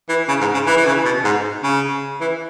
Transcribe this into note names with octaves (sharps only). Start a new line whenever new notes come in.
E3
C#3
G#2
C#3
E3
E3
C#3
B2
G#2
C#3
E3